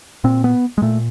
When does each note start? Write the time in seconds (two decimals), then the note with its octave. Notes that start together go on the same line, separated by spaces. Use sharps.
0.24 A#2 C4
0.44 B3
0.78 G#3
0.82 A#2 A3